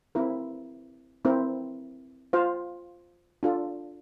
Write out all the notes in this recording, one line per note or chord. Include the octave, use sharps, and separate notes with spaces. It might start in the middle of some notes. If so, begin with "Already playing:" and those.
C4 E4 A#4
C4 E4 A#4
F4 C5 F5
D4 F4 A4